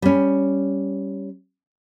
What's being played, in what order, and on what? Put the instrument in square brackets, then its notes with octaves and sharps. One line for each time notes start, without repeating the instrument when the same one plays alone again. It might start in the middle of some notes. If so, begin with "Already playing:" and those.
[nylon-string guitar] G3 C#4